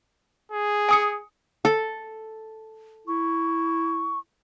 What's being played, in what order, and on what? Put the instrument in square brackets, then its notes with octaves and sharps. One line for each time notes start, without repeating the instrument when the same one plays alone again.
[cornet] G#4
[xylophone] G#5 D#6 C#7
[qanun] A4
[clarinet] E4 [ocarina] C#6